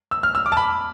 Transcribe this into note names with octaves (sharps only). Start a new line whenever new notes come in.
E6
F6
E6
D6
A5
B5